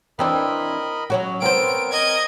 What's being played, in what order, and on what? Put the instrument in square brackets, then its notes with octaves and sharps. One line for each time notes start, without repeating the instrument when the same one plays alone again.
[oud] E3 C4 D4 [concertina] A#4 D#5 B5
[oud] F#3 C#4 F#4
[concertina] B3 A#4 [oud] C4 C5 [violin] D7
[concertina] A#4 [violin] D#5 G#6